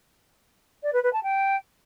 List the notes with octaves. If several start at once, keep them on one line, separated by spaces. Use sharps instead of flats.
D5
B4
B4
A5
G5